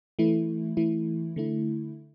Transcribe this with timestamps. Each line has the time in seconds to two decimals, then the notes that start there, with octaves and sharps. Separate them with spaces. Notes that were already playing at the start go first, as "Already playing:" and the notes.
0.19 E3 A3 E4
0.77 E3 A3 E4
1.36 D3 A3 E4